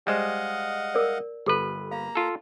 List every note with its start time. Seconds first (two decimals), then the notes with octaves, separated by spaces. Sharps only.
0.07 G3 G#3 C5 D#5 F5 F#5
0.95 A#4 D5
1.46 G1 G4 A4 B4
1.91 A#3 F5 A#5
2.15 F4 A4